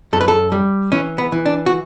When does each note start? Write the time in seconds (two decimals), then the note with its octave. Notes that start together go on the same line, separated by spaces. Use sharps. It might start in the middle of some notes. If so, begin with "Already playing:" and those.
0.13 F#2 A4
0.21 B4
0.28 A4
0.52 G3
0.92 E3 C#4
1.18 B3
1.32 E3
1.46 D4
1.66 F#4